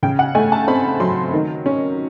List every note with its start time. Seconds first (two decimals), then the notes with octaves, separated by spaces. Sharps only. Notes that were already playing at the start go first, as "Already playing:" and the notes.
0.03 C#3 G5
0.19 F#5
0.35 A3 G#5
0.52 A5
0.68 C4 B5
1.00 F#3 C6
1.33 D#3
1.66 C#4